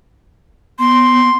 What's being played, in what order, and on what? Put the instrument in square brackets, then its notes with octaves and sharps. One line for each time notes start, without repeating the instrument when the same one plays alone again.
[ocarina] B3 [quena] C6